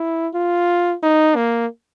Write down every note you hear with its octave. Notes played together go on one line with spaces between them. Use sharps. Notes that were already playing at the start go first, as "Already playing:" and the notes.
Already playing: E4
F4
D#4
A#3